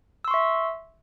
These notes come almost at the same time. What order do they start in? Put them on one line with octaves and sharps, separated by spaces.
E6 C6 C#6 E5